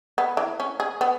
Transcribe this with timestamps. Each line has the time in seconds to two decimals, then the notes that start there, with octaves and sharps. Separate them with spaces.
0.18 B3
0.37 E3
0.60 C#4
0.80 G#4
1.01 B3